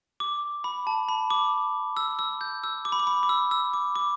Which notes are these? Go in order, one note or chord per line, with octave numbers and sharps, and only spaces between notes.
D6
B5
A5
B5
D6
E6
E6
G6
E6
D6
B5
D6
B5
D6
E6
E6
D6
D6